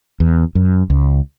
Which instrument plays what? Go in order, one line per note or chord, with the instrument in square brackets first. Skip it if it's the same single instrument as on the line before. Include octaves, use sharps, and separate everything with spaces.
[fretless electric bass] E2
F#2
C#2